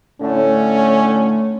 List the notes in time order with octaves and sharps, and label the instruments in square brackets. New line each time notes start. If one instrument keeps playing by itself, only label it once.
[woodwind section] A2 D3 A3 [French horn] C#4